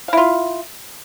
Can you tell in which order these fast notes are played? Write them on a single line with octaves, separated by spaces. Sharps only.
F5 E4 F4